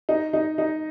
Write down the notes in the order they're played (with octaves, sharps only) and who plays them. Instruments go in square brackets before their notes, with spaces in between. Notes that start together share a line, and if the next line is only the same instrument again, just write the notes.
[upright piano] D#4
D#4
D#4